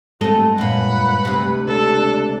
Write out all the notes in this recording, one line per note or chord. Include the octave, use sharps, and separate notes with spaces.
G2 G#3 A3 C4 A4 D#5
F#2 A#2 B4 F#5 B5
D2 C3
C#2 D4 A4